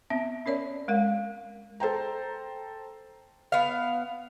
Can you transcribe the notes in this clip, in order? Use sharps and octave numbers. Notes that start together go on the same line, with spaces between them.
B3 C4 E5
C#4 A#4 C#5 D5
G#3 A#4 F5
A4 C5 G5 A#5
B3 F5